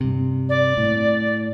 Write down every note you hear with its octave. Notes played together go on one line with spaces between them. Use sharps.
G2 C3
D5
A2